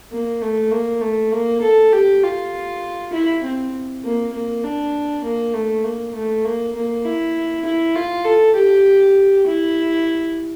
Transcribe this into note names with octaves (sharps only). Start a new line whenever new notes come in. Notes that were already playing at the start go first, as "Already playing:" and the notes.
A#3
A3
A#3
A3
A#3
A4
G4
F4
E4
C4
A#3
A#3
D4
A#3
A3
A#3
A3
A#3
A#3
E4
E4
F4
A4
G4
E4